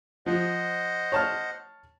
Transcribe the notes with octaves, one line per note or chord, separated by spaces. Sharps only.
F3 C5 D#5 F#5
C#5 A5 F6